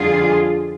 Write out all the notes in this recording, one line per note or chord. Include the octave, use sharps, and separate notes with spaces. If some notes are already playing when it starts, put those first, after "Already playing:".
Already playing: F2 D3 G3 F4 G#4